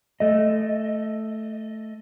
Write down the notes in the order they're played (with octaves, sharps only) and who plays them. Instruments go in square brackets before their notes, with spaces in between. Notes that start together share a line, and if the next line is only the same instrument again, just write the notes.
[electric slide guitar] A3 D#5